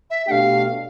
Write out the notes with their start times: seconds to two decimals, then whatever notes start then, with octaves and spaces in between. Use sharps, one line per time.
0.10 E5
0.27 B2 A3 D4 G4 F5 G5